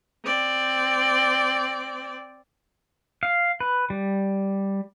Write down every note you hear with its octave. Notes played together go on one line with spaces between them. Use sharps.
C4 D5
F5
B4
G3